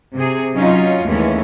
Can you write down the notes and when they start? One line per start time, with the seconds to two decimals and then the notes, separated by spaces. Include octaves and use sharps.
0.14 C3 G#4
0.55 F#3 C#4 D#4 F4
1.06 D#2 E3 G#3 A3 C#4